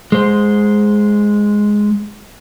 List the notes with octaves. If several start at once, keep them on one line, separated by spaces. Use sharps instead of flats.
G#3 C5